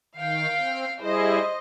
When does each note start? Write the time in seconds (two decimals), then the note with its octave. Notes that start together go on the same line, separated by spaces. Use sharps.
0.16 D#3 F5 G5
0.57 C4
1.00 G3 E4 G#4 C5 D#5